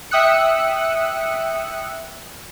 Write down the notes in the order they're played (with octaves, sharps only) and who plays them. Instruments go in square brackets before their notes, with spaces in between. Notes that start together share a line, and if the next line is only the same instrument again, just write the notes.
[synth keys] E5 G5 D#6 E6 F#6 C#7